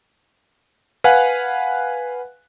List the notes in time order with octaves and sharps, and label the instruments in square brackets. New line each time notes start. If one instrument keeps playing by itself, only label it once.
[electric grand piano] B4 F5 F#5 G#5 F#6